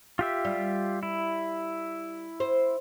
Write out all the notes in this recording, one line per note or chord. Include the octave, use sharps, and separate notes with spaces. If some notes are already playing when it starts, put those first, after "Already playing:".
F4 G4 E5
G3
E4
C5